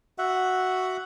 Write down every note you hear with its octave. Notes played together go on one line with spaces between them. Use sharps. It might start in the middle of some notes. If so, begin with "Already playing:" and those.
F#4 E5 F#5